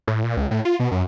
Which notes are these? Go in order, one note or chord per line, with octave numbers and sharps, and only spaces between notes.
A2
A#2
C#2
A2
F4
B2
F#2